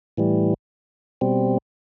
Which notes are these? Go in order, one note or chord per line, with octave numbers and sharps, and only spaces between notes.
A2 E3 G3
B2 G3 C4